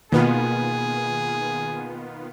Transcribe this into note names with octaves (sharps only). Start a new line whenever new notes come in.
B2 D#3 A#3 B3 F4 G#4